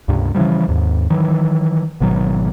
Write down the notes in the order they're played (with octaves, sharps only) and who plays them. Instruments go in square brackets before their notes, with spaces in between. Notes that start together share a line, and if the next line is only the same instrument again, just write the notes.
[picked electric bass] C#2 G2 C3
C#3 E3 F3 G3
D#2 G#2
D#3 E3 F#3
G#1 B2 D#3 F#3